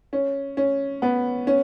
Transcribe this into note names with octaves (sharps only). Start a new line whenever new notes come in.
C#4
C#4
B3
C#4